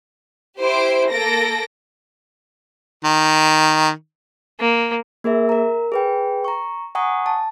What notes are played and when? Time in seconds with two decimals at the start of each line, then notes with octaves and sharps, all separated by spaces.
0.59 E4 G4 C5 D7
1.11 A#3 A4 A#6 D7
3.04 D#3
4.60 A#3
5.24 A#3 G#4 A#4 E5
5.49 A#4 A#5
5.92 G#4 B4 G5
6.44 A#5 C#6
6.95 F#5 G#5 A#5 C#6 D#6
7.26 A5